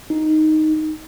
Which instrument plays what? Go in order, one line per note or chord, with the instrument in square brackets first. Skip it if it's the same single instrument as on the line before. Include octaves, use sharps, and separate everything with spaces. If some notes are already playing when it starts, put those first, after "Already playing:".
[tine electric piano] D#4